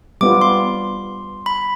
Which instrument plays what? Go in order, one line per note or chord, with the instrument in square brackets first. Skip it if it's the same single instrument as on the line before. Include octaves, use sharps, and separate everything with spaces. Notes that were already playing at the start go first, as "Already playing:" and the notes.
[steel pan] G3 B3 F4 [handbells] D6
[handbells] C6
B5